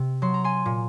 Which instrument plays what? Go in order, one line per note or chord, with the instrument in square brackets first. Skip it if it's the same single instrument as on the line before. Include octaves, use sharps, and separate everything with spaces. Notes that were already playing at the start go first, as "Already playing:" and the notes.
Already playing: [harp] C3
F#3 C6
A#5
G#5 C6
A#2